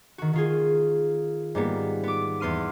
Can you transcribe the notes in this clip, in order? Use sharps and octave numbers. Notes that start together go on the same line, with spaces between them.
D#3 F#4
D#3 F4 G#4
G#2 G3 A#3 B3
B3 D6
E2 B3 C6 F6 D#7